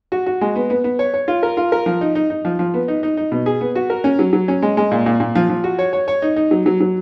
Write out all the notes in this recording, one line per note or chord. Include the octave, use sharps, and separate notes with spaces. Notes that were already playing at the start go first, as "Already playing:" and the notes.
F#4
F#4
G#3
B3
B3
B3
C#5
C#5
F4
A#4
F4
A#4
F3
D#4
D#4
D#4
F3
F3
B3
D#4
D#4
D#4
B2
G#4
B3
F#4
A#4
C#4
F#3
F#3
C#4
G#3
G#3
A#2
A#2
A#2
F3
F3
F#4
C#5
C#5
C#5
D#4
D#4
F#3
F#3
F#3